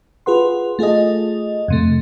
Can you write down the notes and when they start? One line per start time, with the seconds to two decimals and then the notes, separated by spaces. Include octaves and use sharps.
0.26 F4 G#4 B4 F#5 C6
0.79 A3 F4 G#4 A4 D#5
1.68 F2 C3 A3